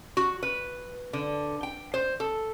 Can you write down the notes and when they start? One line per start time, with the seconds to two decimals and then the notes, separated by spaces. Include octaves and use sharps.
0.17 F#4
0.43 B4
1.13 D3
1.63 G5
1.94 C5
2.20 A4